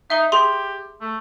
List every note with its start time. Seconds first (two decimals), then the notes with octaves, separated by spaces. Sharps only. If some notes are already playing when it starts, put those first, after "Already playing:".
0.10 D#4 E5 G7
0.32 G4 G#4 C6
1.01 A3